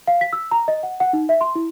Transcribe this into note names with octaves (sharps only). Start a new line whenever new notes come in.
F5
B6
E6
A#5
D#5
F#5
F#5
D#4
E5
C6
E4